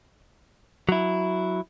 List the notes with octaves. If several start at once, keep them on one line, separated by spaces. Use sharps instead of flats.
F#3 E4